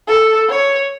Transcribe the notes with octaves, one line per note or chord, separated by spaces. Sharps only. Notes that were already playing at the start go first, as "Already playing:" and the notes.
A4
C#5